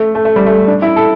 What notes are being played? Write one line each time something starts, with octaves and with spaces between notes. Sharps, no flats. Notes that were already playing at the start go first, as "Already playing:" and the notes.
Already playing: A3
A3
A3
G3
A3
D4
E4
A4